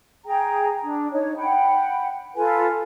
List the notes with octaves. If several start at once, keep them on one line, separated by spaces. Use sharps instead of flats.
G#4 G5 A#5
D4
D#4 C#5
F#5 G5 B5
F4 A4 B4 G#5